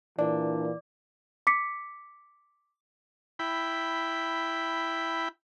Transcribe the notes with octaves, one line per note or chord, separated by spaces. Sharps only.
A#2 E3 D4 D5
D6 B6 C#7
E4 G5 B5